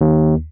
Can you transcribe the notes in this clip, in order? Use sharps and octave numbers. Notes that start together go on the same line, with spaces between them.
D#2